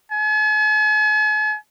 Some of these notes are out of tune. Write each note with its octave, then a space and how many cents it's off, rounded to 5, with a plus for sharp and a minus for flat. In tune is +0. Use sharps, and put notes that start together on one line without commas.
G#5 +45